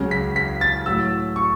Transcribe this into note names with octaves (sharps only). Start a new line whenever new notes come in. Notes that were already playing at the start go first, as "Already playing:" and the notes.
Already playing: C#2 C#3 F#3
B6
B6
A6
A2 F#3 E6
C#6